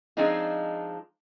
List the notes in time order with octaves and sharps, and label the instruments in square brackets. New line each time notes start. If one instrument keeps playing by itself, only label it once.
[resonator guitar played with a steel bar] F3 G#3 C4 D4 D#4 F4